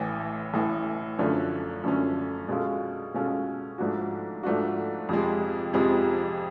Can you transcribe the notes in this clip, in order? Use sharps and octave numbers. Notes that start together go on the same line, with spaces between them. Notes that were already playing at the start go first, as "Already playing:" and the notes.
Already playing: A1 A2 E3
A1 A2 E3
F#2 D3 F3 A3 C#4
F#2 D3 F3 A3 C#4
B2 G#3 C#4 F4 A4
B2 G#3 C#4 F4 A4
G#2 F3 A3 D4 F#4
G#2 F3 A3 D4 F#4
F2 C3 F3 G#3
F2 C3 F3 G#3